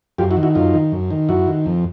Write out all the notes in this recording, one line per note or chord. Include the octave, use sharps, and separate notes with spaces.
F#2 F4 G4
E4 F#4
D#3
E4 F#4
F#2 D#4 F4
D#3
F#2
D#3
F#2 E4 F#4
D#3
F2